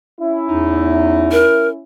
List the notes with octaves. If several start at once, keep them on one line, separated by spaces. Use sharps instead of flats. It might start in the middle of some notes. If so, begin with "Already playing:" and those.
C#4 E4
E2 D#4
A#4